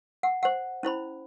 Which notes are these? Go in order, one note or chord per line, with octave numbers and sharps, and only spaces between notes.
F#5
C5 F#5
C#4 E4 C5 B5